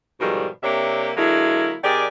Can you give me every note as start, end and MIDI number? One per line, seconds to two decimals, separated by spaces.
0.20 0.47 44
0.20 0.47 47
0.20 0.47 50
0.20 0.47 51
0.20 0.47 53
0.20 0.47 55
0.63 1.11 48
0.63 1.11 58
0.63 1.11 62
0.63 1.11 67
0.63 1.11 73
0.63 1.11 76
1.16 1.73 50
1.16 1.73 54
1.16 1.73 56
1.16 1.73 58
1.16 1.73 64
1.84 2.06 51
1.84 2.06 60
1.84 2.06 67
1.84 2.06 68
1.84 2.06 74